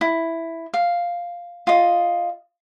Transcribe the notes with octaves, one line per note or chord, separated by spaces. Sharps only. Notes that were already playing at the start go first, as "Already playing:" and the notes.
E4
F5
F4 D#5